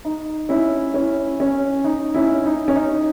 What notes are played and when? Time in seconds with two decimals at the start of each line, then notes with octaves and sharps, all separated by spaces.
0.05 D#4
0.49 C#4 E4
0.94 C#4 E4
1.40 C#4
1.84 D#4
2.14 C#4 E4
2.46 D#4
2.68 C#4
2.76 D#4